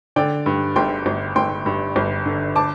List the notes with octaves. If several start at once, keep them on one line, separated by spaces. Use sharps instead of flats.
D3 D5 G5
G2
G1 G5 C6
G1
G1 G5 C6
G2
G1
D3
A5 D6